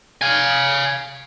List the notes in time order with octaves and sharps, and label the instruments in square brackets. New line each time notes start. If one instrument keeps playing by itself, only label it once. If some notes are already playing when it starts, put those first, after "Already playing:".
[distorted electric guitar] F5 G#5